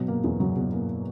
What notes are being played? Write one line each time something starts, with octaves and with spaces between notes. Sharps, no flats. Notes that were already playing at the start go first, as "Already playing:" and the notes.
Already playing: B2 F#3
A#3
E2
F#3
B2
A#3